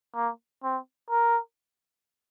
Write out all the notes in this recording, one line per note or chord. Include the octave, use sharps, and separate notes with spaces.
A#3
C4
A#4